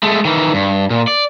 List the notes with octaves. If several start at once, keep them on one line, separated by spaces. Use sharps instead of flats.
G#3 A3
D#3 E3
G2
A#2
D5